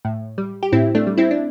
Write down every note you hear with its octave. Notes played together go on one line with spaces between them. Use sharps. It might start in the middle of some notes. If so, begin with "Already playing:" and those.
A2
G3
G4
A2 C4 E4
A3 D4
G3
C4 E4
D4